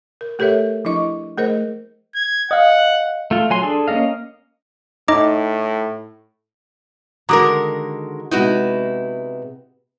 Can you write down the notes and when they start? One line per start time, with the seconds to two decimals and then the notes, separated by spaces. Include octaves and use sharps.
0.21 A#4
0.39 A3 G4 A4 A#4 C#5 E5
0.85 F3 D4 E4 D#5 C#6
1.37 A3 G#4 A#4 C5 D#5
2.15 G#6
2.51 D#5 F5 F#5
3.31 A3 F4
3.50 F#3 G#5 C6
3.63 D4 G#4 A4
3.88 A#3 C#4 D#5 F5
5.08 A2 D#4 D#5 D6
7.29 D3 D#3 G#3 F#4 A#4 A#5 D6 D#6
8.31 C3 G#3 B3 D#4 E4 F#4